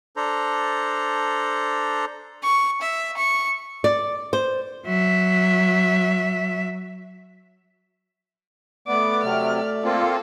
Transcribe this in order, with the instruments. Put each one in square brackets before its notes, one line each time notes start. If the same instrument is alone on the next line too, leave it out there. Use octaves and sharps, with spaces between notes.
[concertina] D4 A4 C5 A#5
[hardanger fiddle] C#6
E5
C#6
[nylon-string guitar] D5
C5
[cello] F#3 E5
[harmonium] A3 D5 [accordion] B3 [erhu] D6
[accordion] C3 F#3 [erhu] F6
[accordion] A#3 C4 F4 [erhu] A4